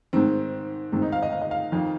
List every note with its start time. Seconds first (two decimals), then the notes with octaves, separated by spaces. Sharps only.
0.13 G#2 D#3 C4
0.92 G#2 D#3 C4
1.02 D#4
1.12 F5
1.22 D#5
1.32 F5
1.41 D#5
1.51 F5
1.72 F2 D#3